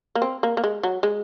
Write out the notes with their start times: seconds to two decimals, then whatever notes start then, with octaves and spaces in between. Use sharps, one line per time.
0.15 A#3
0.22 C4
0.43 A#3
0.57 A#3
0.64 G#3
0.83 F#3
1.03 G#3